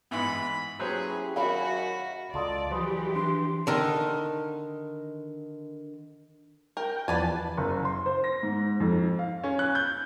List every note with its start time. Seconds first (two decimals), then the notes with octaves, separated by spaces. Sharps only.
0.11 G#2 E3 B3 B5
0.79 F#3 C#4 E4 G4 G#4 B4 C5
1.36 F#2 D#3 F#4 F5 B5
2.34 C#2 F4 A4 D5 D#5
2.71 E3 F#3 G4 G#4 B4 C5
3.16 D4 B4 C6
3.67 D3 D#3 D#4
6.77 A#4 G5
7.08 E2 F3 B4 D5 G#5 A5
7.57 F#1
7.85 C6
8.06 C5
8.24 A#6
8.43 G#2
8.80 F2
9.19 F5
9.44 C#4
9.59 F#6
9.75 G6